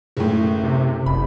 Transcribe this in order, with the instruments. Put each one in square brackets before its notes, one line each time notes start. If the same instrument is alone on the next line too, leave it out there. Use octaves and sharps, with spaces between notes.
[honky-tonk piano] F#1 A2
[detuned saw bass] C3
[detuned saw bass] F#1 [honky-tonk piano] B5